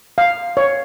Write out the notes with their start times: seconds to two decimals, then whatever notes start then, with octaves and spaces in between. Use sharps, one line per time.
0.18 F5
0.57 C#5